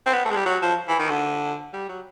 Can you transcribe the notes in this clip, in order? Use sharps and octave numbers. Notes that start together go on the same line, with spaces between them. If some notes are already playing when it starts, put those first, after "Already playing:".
C4
B3
A3
G#3
G3
F#3
F3
E3
D#3
D3
G3
F#3